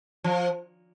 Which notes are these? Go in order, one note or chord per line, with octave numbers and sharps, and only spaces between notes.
F3